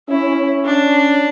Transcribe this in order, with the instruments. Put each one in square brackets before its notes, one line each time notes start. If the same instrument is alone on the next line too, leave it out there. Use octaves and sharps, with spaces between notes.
[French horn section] C#4 [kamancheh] E4
[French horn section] C#4
[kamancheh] D4